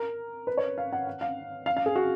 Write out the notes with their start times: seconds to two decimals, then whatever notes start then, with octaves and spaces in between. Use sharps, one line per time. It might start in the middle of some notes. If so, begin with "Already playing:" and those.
Already playing: A#4
0.47 B4
0.58 C#5
0.78 F5
0.93 F#5
1.07 F#5
1.21 F5
1.66 F5
1.77 F5
1.86 G#4
1.96 F#4